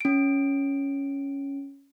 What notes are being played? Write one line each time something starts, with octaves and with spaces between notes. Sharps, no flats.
C#4 D7